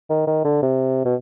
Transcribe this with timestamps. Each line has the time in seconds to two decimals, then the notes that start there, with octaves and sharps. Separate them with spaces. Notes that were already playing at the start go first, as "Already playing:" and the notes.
0.10 D#3
0.27 D#3
0.45 D3
0.62 C3
1.05 B2